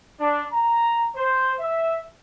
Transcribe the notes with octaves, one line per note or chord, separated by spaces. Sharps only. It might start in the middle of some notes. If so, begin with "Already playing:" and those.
D4
A#5
C5
E5